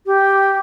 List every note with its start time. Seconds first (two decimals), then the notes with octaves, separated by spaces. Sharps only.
0.06 G4